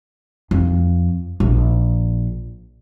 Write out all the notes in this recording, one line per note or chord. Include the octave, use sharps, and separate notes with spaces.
F2
A#1